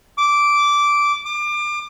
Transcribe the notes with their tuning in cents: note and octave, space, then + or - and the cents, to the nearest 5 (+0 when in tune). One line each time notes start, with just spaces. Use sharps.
D6 -10
D6 +30